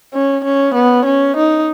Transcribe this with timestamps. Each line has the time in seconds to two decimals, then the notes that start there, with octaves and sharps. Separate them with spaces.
0.14 C#4
0.44 C#4
0.74 B3
1.05 C#4
1.36 D#4